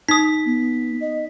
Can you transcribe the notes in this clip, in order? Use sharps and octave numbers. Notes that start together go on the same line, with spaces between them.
D#4 D#6 B6
B3
D#5